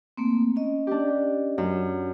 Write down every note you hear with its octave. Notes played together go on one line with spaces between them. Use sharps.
A3 A#3 C4
C#4 D#5
D4 G4
F#2